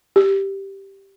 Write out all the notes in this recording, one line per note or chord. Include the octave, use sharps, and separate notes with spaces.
G4